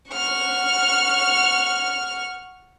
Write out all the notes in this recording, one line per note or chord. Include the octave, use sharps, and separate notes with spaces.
F#5 C#6 F6